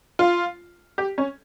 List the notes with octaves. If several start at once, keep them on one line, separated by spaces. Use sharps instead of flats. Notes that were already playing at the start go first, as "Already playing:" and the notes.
F4
G4
C#4